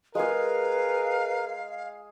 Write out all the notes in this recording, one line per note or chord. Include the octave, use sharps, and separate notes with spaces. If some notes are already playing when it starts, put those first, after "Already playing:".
G#3 G#4 A#4 B4 F5